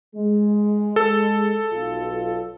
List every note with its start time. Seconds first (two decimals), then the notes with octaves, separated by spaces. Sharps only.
0.16 G#3
0.96 A4
1.73 B1 F4